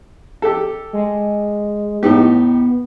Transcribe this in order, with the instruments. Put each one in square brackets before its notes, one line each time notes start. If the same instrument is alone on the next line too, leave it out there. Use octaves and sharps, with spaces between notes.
[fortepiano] G4 A4
[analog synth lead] G#3
[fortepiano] A2 D#4 G4 [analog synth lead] B3